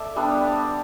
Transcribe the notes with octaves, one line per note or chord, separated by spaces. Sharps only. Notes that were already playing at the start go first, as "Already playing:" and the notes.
Already playing: A3 D5 E5
G3 B3 D4
D5